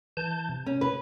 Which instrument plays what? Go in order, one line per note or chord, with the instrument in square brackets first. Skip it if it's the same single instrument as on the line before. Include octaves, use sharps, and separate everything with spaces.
[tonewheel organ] E3 A5 G6
C3
[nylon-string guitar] C#4
B4